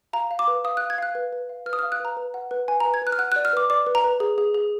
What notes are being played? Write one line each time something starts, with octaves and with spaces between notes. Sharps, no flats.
F5 A#5
F5
D6
B4
F5 D#6
F#6
F5
G#6
F5 F#6
B4
B4
F5
B4 F6
D#6
F6
F5
F#6
B4 A#5
B4
F#5
B4
B4 G#5
A#5
B4
G#6
B4 F#6
F6
F#5 F#6
F#6
D5
F6
B4 D6
D5 D6
B4
A#5
B4
G#4
G#4
G#4